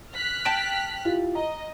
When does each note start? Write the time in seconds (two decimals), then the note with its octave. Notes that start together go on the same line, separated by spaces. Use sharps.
0.13 F6 F#6 B6
0.45 G5 A5
1.05 E4 F4 G4
1.35 D#5 A#5